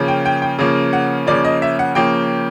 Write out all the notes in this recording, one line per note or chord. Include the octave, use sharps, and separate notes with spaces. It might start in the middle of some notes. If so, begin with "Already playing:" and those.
Already playing: C#3 F3 A#3 C#4
G5
G5
G5
C#3 F3 A#3 C#4
F#5
C#3 F3 A#3 C#4 D5
D#5
E5
F#5
C#3 F3 A#3 C#4 G5